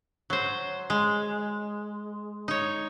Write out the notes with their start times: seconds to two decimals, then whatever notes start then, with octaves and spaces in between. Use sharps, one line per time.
0.30 F#3 C5
0.90 G#3
2.48 D#4 C#5